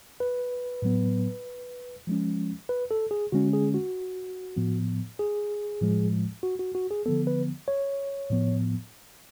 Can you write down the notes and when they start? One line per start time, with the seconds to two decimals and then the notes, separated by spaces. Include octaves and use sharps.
0.20 B4
0.82 A2 F#3 B3
2.07 F3 G#3 C#4
2.69 B4
2.91 A4
3.11 G#4
3.32 D3 G#3 C#4 F#4
3.53 G#4
3.74 F#4
4.57 A2 F3 B3
5.19 G#4
5.81 A2 F3 G#3
6.43 F#4
6.59 F#4
6.75 F#4
6.91 G#4
7.06 D3 F3 B3 A4
7.27 B4
7.68 C#5
8.30 A2 F3 B3